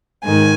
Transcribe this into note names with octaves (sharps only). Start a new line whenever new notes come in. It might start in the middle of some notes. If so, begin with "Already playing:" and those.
G#2 D#3 G#5